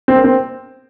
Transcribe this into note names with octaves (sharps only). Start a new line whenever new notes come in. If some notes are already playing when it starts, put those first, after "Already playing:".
C4
A#3
C4